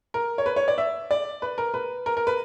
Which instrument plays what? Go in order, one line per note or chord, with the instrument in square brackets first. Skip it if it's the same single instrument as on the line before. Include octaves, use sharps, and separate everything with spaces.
[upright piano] A#4
C#5
B4
C#5
D5
E5
D5
B4
A#4
B4
A#4
A#4
B4